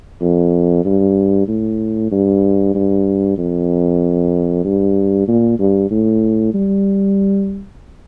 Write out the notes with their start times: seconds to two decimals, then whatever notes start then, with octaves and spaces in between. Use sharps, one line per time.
0.22 F2
0.85 G2
1.48 A2
2.12 G2
2.75 G2
3.38 F2
4.64 G2
5.28 A#2
5.59 G2
5.91 A2
6.54 G3